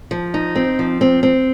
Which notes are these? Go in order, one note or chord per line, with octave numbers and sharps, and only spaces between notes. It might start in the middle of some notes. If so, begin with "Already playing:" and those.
F3
D#4
C4
F3
C4
C4